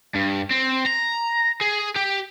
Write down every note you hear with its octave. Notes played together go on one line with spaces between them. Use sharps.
G2
C4
A#5
G#4
G4